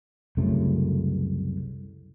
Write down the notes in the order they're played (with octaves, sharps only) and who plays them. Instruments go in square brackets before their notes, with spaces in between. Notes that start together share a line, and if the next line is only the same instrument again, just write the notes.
[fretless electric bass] C2 F#2 C#3 A3